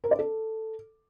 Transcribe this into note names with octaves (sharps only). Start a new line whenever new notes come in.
A#4
D5
A4